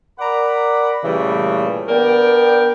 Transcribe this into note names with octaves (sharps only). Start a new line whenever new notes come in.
A#4 D5 F#5 A#5 B5
A#2 C#3 E3 G3 A3
B3 D4 A#4 D5 G5